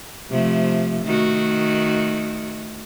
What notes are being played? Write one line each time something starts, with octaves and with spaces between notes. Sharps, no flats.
C3 F3 A3
D#3 A3 F#4